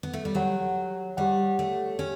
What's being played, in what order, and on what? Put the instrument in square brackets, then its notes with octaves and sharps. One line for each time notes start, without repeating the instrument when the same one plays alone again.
[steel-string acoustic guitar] B3
A3
G3
[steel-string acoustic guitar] F#3 [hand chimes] G4 C#5 F#5
[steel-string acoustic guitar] G3 [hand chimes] G4 C#5 F#5
[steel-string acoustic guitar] A3
[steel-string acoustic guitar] C#4 [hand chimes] G4